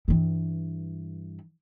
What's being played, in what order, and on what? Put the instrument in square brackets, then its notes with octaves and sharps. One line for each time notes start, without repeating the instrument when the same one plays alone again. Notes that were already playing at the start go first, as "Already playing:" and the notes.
[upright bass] G2 E3